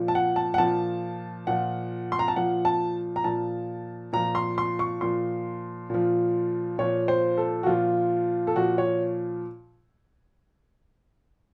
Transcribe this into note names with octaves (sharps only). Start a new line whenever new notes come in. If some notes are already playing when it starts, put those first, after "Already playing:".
Already playing: A#2 F3
A5
F#5
A5
F#5
A#2 F3 A5
A#2 F3 F#5
C6
A#5
A5
A#2 F3 F#5
A5
A#5
A#2 F3 A5
A#2 F3 A#5
C6
C6
C#6
A#2 F3 C6
A#2 F3
A#2 F3 C#5
C5
A4
F#4
A#2 F3 F4
A4
A#2 F3 F#4
C#5